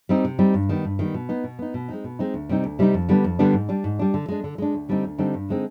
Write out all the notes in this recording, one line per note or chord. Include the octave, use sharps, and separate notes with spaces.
G3 C4 D#4
C3
G3 C4 D#4
G2
D#3 G3 B3
G2
D#3 G3 B3
B2
B3 D#4
B2
B3 D#4
B2
G#3 C4 D#4
B2
G#3 C4 D#4
D2
C3 G3 C4 D#4
D2
C3 G3 C4 D#4
F2
D3 G3 B3 D4
F2
D3 G3 B3 D4
G#2
G3 D4
G#2
G3 D4
D3
G#3 D4
D3
G#3 D4
D2
D3 G3 C4 D#4
D2
D3 G3 C4 D#4
G2
D3 G#3 C4 D#4